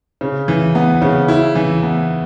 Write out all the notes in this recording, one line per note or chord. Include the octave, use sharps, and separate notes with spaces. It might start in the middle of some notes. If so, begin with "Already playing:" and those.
C#3
E3
B3
C#3
E4
E3
B3